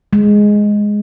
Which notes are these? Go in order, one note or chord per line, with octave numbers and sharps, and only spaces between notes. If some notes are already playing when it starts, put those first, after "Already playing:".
G#3